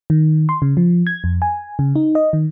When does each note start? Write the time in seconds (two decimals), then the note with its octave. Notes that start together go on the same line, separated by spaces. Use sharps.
0.10 D#3
0.49 C6
0.62 C#3
0.77 F3
1.07 G#6
1.24 F2
1.42 G#5
1.79 C#3
1.96 D#4
2.15 D#5
2.33 D#3